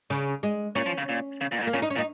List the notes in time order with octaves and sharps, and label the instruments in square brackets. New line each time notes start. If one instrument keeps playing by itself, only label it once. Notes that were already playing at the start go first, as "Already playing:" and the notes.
[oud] C#3
G#3
[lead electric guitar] A#2 [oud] C#4
[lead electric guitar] F3
C#3
A#2
C#3
A#2
G#2
A#2
[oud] A#3
[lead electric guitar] A#2 [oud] C#4
[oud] D#4
C#4
[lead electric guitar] A#2
[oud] D#4